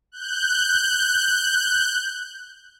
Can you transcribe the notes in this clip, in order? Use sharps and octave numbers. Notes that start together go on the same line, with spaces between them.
F#6 G6